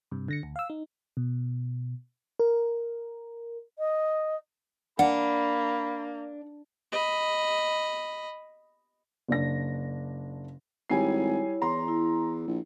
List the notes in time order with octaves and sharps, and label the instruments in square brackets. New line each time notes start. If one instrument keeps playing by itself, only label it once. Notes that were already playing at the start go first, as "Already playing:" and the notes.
[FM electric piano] G2 C3
D3 A#6 C#7
D2
F5 E6
D#4
B2
A#4
[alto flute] D#5
[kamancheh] A#3 [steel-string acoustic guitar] D4 [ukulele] F#5 [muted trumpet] B5
[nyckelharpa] D#5 B5
[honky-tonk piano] F#1 D4 A#6
[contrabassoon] G#1 [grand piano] G3 G#5 C7 [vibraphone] E4 C#5
[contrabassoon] E2 [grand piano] A#5 C6
[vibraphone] E4
[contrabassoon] A#1